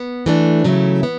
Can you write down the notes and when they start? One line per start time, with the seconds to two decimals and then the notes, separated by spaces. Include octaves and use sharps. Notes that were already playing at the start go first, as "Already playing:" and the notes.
Already playing: B3
0.26 E3 A3 D4
0.64 C#3 F#3 A3 E4
1.03 B3